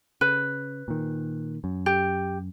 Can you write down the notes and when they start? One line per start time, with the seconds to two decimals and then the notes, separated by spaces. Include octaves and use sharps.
0.21 C#3 B4
0.88 A#2 D#3
1.64 F#2
1.86 G4